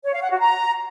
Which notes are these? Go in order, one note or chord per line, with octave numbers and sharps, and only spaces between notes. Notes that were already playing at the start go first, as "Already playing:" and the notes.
C#5
F5
F#5
F#4
A#5